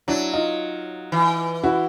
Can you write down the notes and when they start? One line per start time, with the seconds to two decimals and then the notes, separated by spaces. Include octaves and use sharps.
0.08 F#3 D4 E4
0.33 D#4 F4
1.12 E3
1.64 E4 F#4